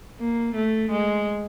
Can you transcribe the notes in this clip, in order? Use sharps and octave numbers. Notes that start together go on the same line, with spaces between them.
A#3
A3
G#3